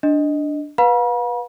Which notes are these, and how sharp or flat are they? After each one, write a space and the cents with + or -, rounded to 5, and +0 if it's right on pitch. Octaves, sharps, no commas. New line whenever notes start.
D4 +0 D#5 +0
B4 -15 F5 +40 B5 -45